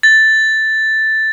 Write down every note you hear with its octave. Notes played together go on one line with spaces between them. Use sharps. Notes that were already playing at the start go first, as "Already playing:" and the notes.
A6